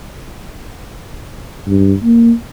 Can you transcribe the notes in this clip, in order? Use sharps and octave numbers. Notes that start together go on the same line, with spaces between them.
G2
A#3